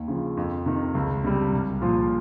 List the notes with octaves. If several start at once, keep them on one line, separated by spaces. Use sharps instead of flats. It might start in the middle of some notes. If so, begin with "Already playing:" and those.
Already playing: D#2
C#3 F3
F2
C3 D#3
C#2
C3 G3
C2
A#2 F3